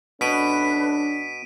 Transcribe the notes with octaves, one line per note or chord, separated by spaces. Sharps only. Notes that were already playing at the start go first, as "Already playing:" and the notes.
B2 A3 C#4 D4 B4 B6 D7 D#7